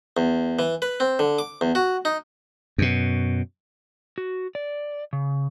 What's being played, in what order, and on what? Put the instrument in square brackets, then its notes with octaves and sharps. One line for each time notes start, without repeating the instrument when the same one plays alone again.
[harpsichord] E2
E3
B4
C4
D3
D6
E2
F#4
D#4
[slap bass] F#2 B2
[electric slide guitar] F#4
D5
C#3